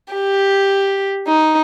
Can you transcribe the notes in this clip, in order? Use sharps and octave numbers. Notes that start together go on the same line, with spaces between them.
G4
D#4